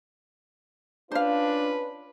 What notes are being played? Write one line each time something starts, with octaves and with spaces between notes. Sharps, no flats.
C#4 D4 F4 B4 C5 F5